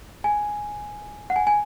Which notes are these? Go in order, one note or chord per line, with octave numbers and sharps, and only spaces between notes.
G#5
F#5
G#5
G#5